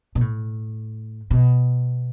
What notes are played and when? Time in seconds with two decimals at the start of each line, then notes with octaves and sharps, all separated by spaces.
0.15 B2
0.21 A2
1.31 B2